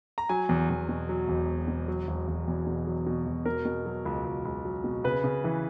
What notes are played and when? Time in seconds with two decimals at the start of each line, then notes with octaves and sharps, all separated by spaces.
0.18 A#5
0.29 F#3 G#5
0.49 E2
0.70 E2
0.89 B2
1.09 F#3
1.28 E1
1.48 E1
1.68 B2
1.88 F#3
2.08 E1
2.28 E1
2.48 E2
2.67 B2
2.87 F#3
3.07 B2
3.27 E1
3.45 B2 A#4
3.65 B2
3.86 F#3
4.06 C#2
4.25 C#2
4.45 C#2
4.65 F#3
4.84 B2
5.04 C#3 B4
5.24 C#3
5.44 E3